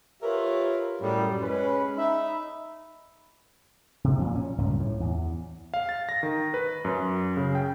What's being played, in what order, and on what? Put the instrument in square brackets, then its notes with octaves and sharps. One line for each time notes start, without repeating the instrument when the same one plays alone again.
[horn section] F4 G4 A#4 B4 C#5 E5
F#2 A2 G3
G#3 C#4 B4
D#4 E5 B5
[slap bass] C3
F2 A#2
C#4
C#2 G2 A#2
A2
E2
[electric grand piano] F5
A6
A#6
D#3
B4
F#2
C#3
G5